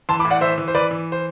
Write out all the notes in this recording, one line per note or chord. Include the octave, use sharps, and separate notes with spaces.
E3 A5 C6
B5 D6
A2
D5 F#5
E3 C5 E5
E3
C5
E3 B4 D5
E3
C5